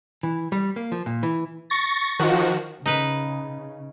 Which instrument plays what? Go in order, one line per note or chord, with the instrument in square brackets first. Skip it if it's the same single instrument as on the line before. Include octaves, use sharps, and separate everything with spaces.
[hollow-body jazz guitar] E3
G3
A#3
F3
A#2
E3
[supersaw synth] C#6 A6 A#6
D#3 F3 F#4
[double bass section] C#3 [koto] D#4 B4